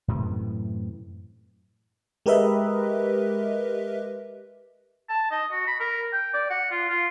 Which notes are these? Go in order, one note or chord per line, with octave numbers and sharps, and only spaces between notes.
F#2 A2 C3 E3
G#3 G4 A#4 B4 D#5 E5
A5
D#5
F#4
B5
A#4
G5
D5
F#5
F4
F4